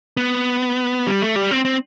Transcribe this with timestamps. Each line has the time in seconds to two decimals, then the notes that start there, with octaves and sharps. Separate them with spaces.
0.17 B3
1.07 G3
1.22 A3
1.36 G3
1.51 C4
1.65 C4